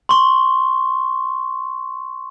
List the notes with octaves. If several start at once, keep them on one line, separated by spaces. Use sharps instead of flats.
C6 C#6